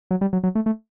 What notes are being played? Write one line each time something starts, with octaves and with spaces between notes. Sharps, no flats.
F#3
G3
F#3
F#3
A3
A3